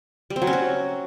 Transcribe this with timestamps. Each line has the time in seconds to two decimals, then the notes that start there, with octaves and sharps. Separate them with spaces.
0.30 G3
0.36 C4
0.42 F#3
0.47 C#4
0.53 F#4